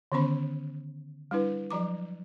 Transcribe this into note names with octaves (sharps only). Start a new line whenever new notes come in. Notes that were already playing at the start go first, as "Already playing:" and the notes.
D3 D#3 B3 C#4 C5 B5
G3 D4 E4 B4
F3 F#3 A#5 D6